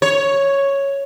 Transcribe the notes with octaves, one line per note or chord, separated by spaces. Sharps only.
C#5